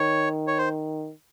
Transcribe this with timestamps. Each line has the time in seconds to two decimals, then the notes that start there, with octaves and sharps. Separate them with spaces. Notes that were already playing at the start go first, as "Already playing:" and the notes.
Already playing: D#3 C#5
0.47 C#5
0.58 C5